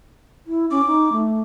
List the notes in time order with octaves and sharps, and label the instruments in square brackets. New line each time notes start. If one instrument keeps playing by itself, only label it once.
[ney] E4
[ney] C#4 [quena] D6
[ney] D#4
A3